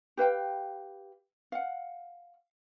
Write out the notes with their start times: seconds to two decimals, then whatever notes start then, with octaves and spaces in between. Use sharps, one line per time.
0.17 G4 B4 F5 G5
1.52 F5 F#5